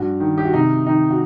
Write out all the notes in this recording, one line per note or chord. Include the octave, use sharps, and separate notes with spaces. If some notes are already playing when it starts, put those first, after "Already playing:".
Already playing: G2 F#4
D#3
G4
F#4
C3 D#4
D#3 D#4
F#4